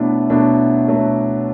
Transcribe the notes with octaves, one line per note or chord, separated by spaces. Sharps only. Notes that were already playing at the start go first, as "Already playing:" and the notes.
Already playing: B2 F#3 A3 D4 E4
B2 F#3 A3 D4
B2 F#3 A3